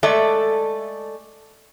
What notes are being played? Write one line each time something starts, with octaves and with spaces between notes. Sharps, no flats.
G#3 A3 A4 D5 E5